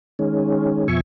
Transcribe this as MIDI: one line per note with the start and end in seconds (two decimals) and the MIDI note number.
0.19 0.88 51
0.19 0.88 56
0.19 0.88 61
0.88 1.00 41
0.88 1.00 47
0.88 1.00 53
0.88 1.00 76
0.88 1.00 80
0.88 1.00 85